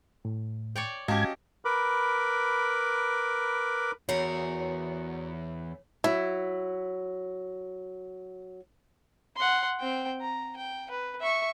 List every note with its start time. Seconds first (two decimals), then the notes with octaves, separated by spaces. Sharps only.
0.25 A2
0.76 C#5 D5 G5
1.08 G#2 C#4 F#4 G4 D#5 F5 A5 G#6
1.65 A#4 B4 B5 D6
4.09 E2 F#4 A#4 C#5
6.04 F#3 E4
9.36 F#5 C6
9.79 C4 G5
10.20 A#5
10.56 G5
10.90 B4
11.21 E5 C#6